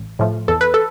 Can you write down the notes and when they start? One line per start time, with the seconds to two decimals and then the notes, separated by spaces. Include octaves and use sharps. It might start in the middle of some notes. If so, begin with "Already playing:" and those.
Already playing: A1
0.19 A2 F3 A3
0.48 E2 A4
0.61 B4
0.74 A4